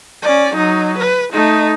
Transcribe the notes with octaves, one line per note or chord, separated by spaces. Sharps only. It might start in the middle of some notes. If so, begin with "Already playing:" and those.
C#4 D5
F#3 D#4
B4
A3 D#4